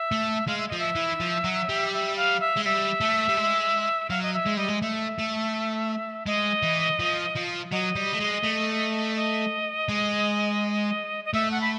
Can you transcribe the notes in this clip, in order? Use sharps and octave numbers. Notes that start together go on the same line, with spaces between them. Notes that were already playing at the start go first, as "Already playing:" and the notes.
Already playing: E5
A3
G#3 F5
E5
F3 D#5
E5
E3
F3
F#3
G3
E5
F5
E5
G#3
G3 E5
A3
G3
G#3
F#3 F5
D#5
E5
G#3
G3 D#5
G#3
A3 E5
A3
G#3 D#5
E3
F3
F3
F#3 D#5
G3
A3
G#3
A3
D#5
G#3
D#5
A3 E5
F#5
B5